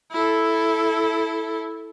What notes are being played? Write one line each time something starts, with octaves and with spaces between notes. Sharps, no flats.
E4 A4